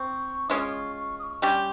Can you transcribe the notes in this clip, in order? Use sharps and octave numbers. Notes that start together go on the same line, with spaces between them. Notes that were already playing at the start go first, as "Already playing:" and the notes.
Already playing: C4 C#6
G#3 C#4 F4 D#6 F6
C#6
C#6
D#6
C#6
G3 C#4 G4 C6 C#6